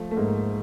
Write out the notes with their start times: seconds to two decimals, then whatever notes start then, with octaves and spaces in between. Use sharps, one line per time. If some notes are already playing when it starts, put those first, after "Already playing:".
Already playing: F3 A3
0.11 A3
0.16 G#2 A#3